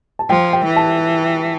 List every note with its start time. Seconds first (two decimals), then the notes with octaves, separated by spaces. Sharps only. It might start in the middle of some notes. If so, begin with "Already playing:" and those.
0.19 A5
0.30 F3 G5
0.53 G5
0.65 E3
0.76 A5